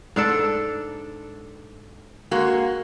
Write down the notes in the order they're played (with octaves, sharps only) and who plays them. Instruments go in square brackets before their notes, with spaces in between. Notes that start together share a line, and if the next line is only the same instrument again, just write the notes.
[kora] G#2 D4 A4
[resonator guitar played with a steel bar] G#3 A#3 F#4